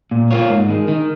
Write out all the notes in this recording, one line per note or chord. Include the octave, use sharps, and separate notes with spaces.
A#2
A#3 F4 C#5
G#2
D#3 G#3
D#3